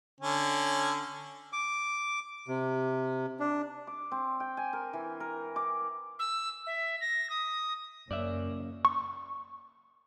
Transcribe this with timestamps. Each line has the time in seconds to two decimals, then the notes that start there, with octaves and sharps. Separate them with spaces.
0.20 D3 C#4
1.53 D6
2.48 C3
3.40 D4
3.87 D6
4.12 C4
4.40 G5
4.57 G#5
4.73 A#4
4.93 E3
5.20 A#4
5.56 D6
6.19 E6
6.67 E5
7.01 A#6
7.30 D#6
8.11 F#1 F#2 A#3 C#4 D5 E5
8.85 C#6